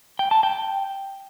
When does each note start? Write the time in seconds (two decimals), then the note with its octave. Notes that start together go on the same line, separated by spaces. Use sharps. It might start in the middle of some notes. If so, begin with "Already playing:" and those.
0.19 G5
0.31 A5
0.43 G5